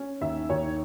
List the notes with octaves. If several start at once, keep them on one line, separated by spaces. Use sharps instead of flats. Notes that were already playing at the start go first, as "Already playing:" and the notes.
Already playing: C#4
D#2 E5
D#2 C#5